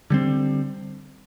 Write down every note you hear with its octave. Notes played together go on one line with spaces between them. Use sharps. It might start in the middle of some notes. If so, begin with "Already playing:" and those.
D3 G3 C4